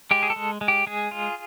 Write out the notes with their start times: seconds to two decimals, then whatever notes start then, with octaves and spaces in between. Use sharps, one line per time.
0.11 G#3 G4
0.23 G#4
0.30 A4
0.36 G#3
0.61 G#3
0.68 G4
0.87 G#3 G#4
1.11 F4